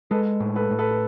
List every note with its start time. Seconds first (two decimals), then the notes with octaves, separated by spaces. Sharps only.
0.11 G#3 A4 B4
0.40 A2
0.56 A4 B4
0.71 A2
0.79 A4 B4
0.91 B4